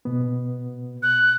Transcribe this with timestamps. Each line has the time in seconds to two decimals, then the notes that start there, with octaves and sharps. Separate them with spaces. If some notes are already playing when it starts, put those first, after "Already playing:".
0.05 B2 B3
1.03 F#6